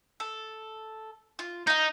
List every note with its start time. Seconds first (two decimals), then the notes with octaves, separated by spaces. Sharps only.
0.20 A4
1.39 F4
1.67 D#4 F5 G6